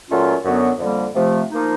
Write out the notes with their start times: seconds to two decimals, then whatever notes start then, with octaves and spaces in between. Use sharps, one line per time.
0.07 A#2 F#3 A3 C#4 F4
0.44 F#2 D3 F#3 B3
0.79 F2 D3 G3 A#3
1.14 C3 F3 A3
1.50 F3 A#3 D#4